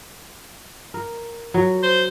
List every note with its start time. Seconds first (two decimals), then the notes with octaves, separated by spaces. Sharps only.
0.94 A#4
1.54 F#3
1.83 C5